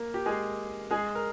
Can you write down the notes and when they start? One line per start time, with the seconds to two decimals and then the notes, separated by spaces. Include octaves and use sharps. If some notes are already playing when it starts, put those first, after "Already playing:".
Already playing: A#3 A#4
0.14 G4
0.26 G#3 G#4
0.90 G#3 G#4
1.15 A#4